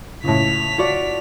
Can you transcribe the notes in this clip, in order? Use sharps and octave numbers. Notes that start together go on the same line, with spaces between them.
C#2 A2 B6 F7
F4 F#4 D5